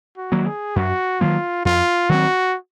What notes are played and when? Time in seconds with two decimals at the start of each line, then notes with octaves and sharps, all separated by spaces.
0.17 F#4
0.32 D#3 F#3 A#3
0.46 G#4
0.76 F#2 F#4
1.21 D#3 F#3 A#3 F4
1.65 F2 F4
2.09 D#3 F#3 C4 F#4